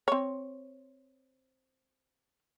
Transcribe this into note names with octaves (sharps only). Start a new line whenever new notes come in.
C4 C#5